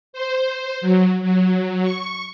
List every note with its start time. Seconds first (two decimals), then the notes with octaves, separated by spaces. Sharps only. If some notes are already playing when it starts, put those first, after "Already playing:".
0.13 C5
0.81 F#3
1.22 F#3
1.84 C#6